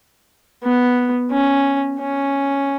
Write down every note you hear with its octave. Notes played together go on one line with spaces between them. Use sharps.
B3
C#4
C#4